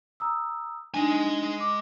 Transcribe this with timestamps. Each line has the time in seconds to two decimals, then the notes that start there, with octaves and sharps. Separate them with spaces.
0.20 A#5 D#6 E6
0.94 G#3 D4 D#4 G#5
1.60 D6